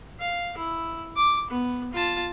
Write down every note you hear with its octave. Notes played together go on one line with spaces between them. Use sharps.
F5
E4
D6
B3
F4 A5